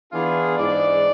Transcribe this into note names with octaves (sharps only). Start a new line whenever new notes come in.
E3 B3 D4 F4 G#4
G#2 E3 G#3 D4 D5